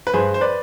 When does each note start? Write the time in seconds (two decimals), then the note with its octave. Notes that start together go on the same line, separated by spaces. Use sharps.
0.07 B4
0.14 G2 G#4 C5
0.34 C5
0.41 B4 D5